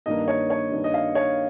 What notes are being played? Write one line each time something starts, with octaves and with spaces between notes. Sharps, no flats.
G2 D#3 A#3 D#5
C#5
C#5
G2 D#3 A#3
D#5
F5
C#5